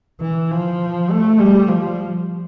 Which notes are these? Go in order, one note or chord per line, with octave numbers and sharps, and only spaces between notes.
E3
F3
A3
G3
F3